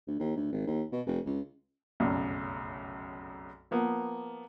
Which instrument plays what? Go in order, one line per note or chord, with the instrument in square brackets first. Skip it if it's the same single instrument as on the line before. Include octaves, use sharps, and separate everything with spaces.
[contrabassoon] D2
D#2
D2
G#1
D#2
B2
F1
C#2
[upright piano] F1 B1 F#2 C#3
F3 A#3 B3